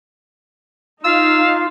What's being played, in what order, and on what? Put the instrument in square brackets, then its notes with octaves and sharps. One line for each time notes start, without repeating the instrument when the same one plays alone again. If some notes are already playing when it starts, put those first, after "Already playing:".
[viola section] D#4 [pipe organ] F4 [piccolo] F5 [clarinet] E6